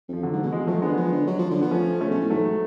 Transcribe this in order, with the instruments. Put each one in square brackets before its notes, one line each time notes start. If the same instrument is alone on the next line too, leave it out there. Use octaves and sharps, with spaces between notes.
[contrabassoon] F2 [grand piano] F3
[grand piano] D3 F#3
[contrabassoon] G#2
[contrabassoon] B2 [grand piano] F#3
[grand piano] F3 G#3
[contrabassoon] F3 [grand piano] F#3 A3
[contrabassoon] D3 [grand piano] G#3 B3
[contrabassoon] F3
D3
F#3
F3
D3
[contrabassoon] F3 [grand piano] B3
[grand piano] A3 C#4
[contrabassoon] C#3 [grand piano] A3 C#4
[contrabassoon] B2
A2
[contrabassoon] G#2 [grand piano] F#3 A3